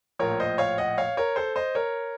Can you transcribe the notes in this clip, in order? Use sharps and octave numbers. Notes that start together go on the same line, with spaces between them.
A#1 A2 F3 A#4 C#5
C5 D#5
C#5 F5
D#5 F#5
C#5 F5
A#4 C#5
A4 C5
C5 D#5
A#4 C#5